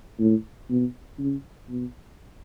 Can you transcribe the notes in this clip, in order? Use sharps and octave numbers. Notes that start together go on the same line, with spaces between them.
A2
B2
C#3
B2